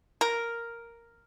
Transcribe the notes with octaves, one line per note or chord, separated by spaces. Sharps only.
A#4